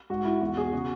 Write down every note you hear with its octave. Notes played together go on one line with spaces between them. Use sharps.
G#2 F#4
G#2 E4
E2 F#4
B2 G#4
C#3 F#4